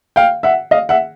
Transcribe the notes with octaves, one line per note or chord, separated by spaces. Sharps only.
F5 G5
E5 F#5
D#5 F5
E5 F#5